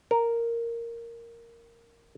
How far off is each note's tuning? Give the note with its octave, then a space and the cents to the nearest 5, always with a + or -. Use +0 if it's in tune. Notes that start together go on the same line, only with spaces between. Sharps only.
A#4 -5